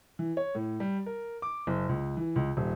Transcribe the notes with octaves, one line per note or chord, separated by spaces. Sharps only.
E3
C#5
A2
G3
A#4
D6
F#1
C#2
E3
C#2
D#1